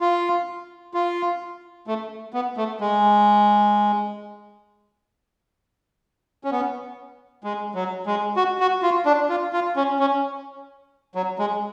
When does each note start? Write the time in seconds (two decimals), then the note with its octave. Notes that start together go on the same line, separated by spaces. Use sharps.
0.01 F4
0.94 F4
1.87 A3
2.34 B3
2.57 A3
2.80 G#3
6.44 C#4
6.52 B3
7.44 G#3
7.75 F#3
8.06 G#3
8.36 F#4
8.60 F#4
8.83 F4
9.06 D4
9.29 F4
9.53 F4
9.76 C#4
9.99 C#4
11.15 F#3
11.39 G#3